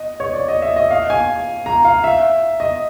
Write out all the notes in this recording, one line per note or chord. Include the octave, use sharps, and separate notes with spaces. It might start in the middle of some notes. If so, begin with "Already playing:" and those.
Already playing: D#5
C#5
D5
D#5
E5
D#5
F5
G#5
A#5
F5
E5
D#5